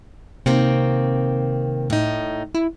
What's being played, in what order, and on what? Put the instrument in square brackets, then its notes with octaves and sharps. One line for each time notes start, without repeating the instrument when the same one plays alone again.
[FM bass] C3 [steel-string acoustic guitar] D#3 A#3 C4
[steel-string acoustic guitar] A2 D#4
[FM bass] E4